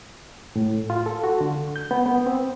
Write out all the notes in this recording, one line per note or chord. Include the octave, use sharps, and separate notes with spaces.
A2
F4
A4
F#4
D3
G6
B3
B3
C4